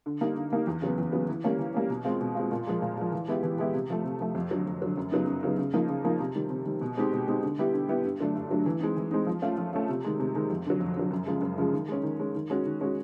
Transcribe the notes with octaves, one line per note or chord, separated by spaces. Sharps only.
D3
G3 A#3 D#4
D3
G3 A#3 D#4
E2
C#3 F#3 B3
E2
C#3 F#3 B3
E3
G3 A#3 C#4
E3
G3 A#3 C#4
B2
G#3 C4 F4
B2
G#3 C4 F4
A#2
F3 G#3
A#2
F3 G#3
E3
G#3 B3 E4 G4
E3
G#3 B3 E4 G4
C3
F3 A3
C3
F3 A3
F2
D3 F#3
F2
D3 F#3
F#2
C#3 F#3 B3 D#4
F#2
C#3 F#3 B3 D#4
C#3
F3 A#3 D#4
C#3
F3 A#3 D#4
C3
D#3 G3
C3
D#3 G3
B2
G#3 C4 D#4 G4
B2
G#3 C4 D#4 G4
D3
G3 B3 E4 G4
D3
G3 B3 E4 G4
G2
D3 F#3 A3 D4
G2
D3 F#3 A3 D4
E3
G#3 C4 D#4
E3
G#3 C4 D#4
F3
A3 C#4 F4
F3
A3 C#4 F4
C3
D#3 G#3
C3
D#3 G#3
F2
D3 F#3
F2
D3 F#3
F#2
C#3 F3 G#3
F#2
C#3 F3 G#3
D#3
G#3 C#4
D#3
G#3 C#4
D#3
G#3 C#4 F#4
D#3
G#3 C#4 F#4